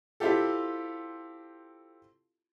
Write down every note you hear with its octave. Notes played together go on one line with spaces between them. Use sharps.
C4 E4 F4 G4 A4